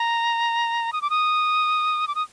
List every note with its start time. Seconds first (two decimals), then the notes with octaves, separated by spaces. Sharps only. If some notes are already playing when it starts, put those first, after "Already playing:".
Already playing: A#5
0.93 D#6
1.02 D6
1.10 D#6
2.08 D6
2.15 D#6